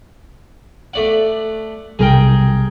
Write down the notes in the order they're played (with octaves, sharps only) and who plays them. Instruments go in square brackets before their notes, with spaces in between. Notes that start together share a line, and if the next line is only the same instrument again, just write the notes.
[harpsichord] A3 D5 F#5
[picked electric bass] B1 C3 G3 [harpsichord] G#4 A#4 G5